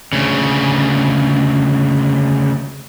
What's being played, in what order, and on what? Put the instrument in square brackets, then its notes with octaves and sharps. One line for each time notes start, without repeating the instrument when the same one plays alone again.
[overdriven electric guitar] D2 C#3